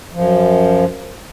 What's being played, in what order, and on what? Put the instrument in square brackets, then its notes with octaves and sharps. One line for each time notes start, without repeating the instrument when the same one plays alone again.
[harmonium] F#2 F3